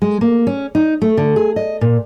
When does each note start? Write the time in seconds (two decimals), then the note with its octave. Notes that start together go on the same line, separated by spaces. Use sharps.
0.02 G#3
0.21 A#3
0.47 C#4
0.75 D#4
1.02 A3
1.17 D3
1.36 G#4
1.56 D#5
1.81 A#2